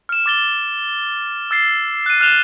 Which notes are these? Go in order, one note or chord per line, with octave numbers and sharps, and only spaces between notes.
F6 E7
D6 A6 G7
E6 A6 C7
F#6 D#7
F6 F#6 E7 F7 G7